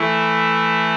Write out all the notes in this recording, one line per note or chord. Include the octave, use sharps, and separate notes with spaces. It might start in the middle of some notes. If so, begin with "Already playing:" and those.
Already playing: E3 A3 E4